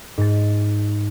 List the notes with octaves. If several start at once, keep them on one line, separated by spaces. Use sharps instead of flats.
G#2 A6